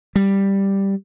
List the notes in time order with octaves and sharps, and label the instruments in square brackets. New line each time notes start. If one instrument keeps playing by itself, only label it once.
[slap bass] G3